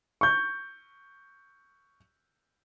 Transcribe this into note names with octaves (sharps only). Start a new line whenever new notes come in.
C#6 G6